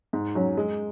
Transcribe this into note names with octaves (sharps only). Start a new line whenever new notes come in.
G#2
F#3 C#4
G#3